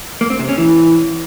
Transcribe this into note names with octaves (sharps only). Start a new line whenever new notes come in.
A#3
C4
C3
C#4
E3